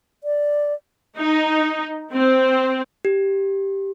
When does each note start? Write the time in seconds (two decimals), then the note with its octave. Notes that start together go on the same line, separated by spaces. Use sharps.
0.24 D5
1.17 D#4
2.13 C4
3.05 G4